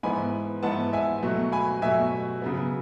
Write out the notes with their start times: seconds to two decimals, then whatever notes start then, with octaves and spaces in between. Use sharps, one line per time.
0.03 G#2 E3 B3 G#5 B5
0.63 G#2 E3 B3 F#5 A5
0.93 E5 G#5
1.22 B2 F#3 A3
1.52 G#5 B5
1.82 B2 F#3 A3 E5 G#5
2.42 C#3 F#3 B3